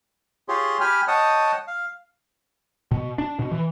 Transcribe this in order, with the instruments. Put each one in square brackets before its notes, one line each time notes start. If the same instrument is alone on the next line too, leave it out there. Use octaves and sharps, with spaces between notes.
[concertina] F4 G4 G#4 C#5 C6
G4 G5 G#5 B5 F6
C#5 D#5 F#5 G5 A5 D#6
F5
[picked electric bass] B2
D4
B2
E3